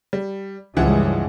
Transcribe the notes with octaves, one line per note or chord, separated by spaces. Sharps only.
G3
C#2 G2 E3 F3 G#3 F#5